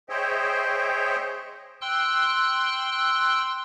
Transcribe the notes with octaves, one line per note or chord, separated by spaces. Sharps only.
G#4 C5 C#5 D#5 E5 G5
G5 C6 E6 F#6